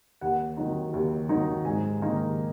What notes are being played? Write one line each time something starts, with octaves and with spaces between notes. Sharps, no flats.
D#2 F#5
D#3 F#3 D#4
D#2
D#3 F#3 D#4
G#2 G#5
D#3 A#3 D#4